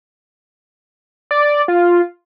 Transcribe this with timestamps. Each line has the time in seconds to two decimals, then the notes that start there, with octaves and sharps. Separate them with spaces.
1.31 D5
1.68 F4